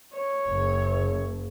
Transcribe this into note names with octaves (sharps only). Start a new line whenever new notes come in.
C#5
F#1